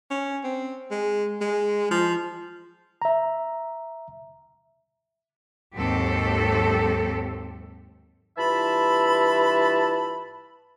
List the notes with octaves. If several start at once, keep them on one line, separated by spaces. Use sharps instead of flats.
C#4
C4
G#3
G#3
F3
E5 A#5
D#2 G#2 F#3 C4 G4 A4
G2 E3 F4 E5 A5 B5